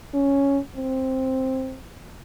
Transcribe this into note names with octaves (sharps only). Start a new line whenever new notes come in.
C#4
C4